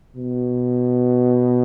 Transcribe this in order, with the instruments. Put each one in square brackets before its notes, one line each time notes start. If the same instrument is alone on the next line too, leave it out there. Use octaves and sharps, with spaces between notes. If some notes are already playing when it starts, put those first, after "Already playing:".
[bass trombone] B2